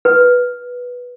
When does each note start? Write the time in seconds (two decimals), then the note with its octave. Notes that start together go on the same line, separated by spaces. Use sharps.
0.05 B4